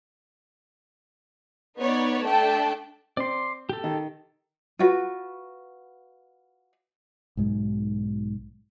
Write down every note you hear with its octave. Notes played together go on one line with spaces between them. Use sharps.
B3 D#4 B4 C#5 D5
A3 D4 D5 G5 A5
C4 D5 C6
G4 A4
D#3
F4 F#4 B4
B1 G#2 G#3